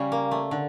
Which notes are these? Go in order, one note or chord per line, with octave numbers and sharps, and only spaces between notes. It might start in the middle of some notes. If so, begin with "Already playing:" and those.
Already playing: C#3 G3 C#4
A#3
A3
D3